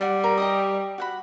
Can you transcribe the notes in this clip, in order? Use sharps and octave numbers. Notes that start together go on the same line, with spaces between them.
G3 D5 F#5
A#4
G4 D#5 D#6
F#4 F#5 B5